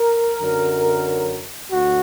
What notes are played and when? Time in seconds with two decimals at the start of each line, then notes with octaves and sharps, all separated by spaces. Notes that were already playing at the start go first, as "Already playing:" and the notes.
Already playing: A#4
0.40 F#2 D3 F#3
1.72 D2 F#4